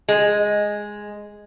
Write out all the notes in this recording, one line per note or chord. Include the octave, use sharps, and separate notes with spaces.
G#3